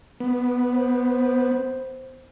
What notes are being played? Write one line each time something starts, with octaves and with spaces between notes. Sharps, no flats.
B3
C5